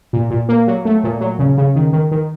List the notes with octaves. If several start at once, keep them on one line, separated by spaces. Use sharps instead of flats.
A#2
A#2
A#3
F#3
A3
A#2
F#3
C#3
C#3
D#3
D#3
D#3